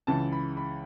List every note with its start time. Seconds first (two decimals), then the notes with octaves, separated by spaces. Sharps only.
0.07 C#2 C#3 E3 A5
0.32 B5
0.57 B5